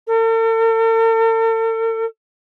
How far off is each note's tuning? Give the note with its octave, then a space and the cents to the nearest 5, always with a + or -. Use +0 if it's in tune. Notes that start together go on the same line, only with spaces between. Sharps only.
A4 +45